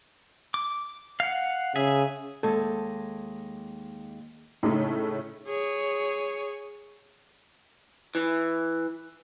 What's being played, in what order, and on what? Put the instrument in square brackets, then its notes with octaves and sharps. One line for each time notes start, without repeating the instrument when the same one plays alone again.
[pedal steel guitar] D6
F5 F#5
[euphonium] C#3 [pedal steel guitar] G#4 E5
[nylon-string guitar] D#2 G#3 [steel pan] A4
[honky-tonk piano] A2 C#3 A3 [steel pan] D#4
[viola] G#4 C#5
[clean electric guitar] E3